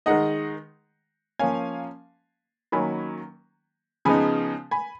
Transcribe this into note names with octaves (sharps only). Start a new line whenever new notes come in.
D#3 G#3 D#4 D#5 F#5
F3 A#3 C#4 F5 G#5
D#3 F#3 A#3 C#4 G#5 B5
C#3 F3 G#3 B3 D#4 G#5 B5
G#5 B5